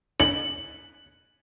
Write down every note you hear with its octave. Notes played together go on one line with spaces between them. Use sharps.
F#7